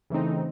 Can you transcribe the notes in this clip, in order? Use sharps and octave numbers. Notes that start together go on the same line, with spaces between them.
C#3 E3 A3 C4 D#4